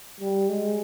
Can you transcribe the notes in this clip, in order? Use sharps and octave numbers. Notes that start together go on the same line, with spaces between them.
G3
G#3